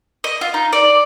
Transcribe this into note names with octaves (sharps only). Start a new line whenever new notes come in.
D#5
F4
D#4
D5